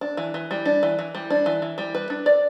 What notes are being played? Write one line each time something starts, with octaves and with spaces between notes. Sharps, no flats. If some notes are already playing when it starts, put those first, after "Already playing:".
D4
E3
E3
G3
D4
E3
E3
G3
D4
E3
E3
G3
B4
D4
D5